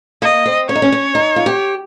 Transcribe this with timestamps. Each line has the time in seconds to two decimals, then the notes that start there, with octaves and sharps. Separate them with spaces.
0.22 A#3 D#5
0.46 C4
0.69 C#4 C#5
0.75 D#4
0.82 C#4
0.92 C#4
1.15 D#4
1.36 F4
1.46 G4